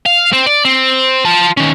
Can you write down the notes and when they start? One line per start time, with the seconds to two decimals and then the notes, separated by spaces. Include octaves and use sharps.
0.06 F5
0.33 C4
0.46 D5
0.65 C4
1.25 F4 A5
1.57 D#3 C#4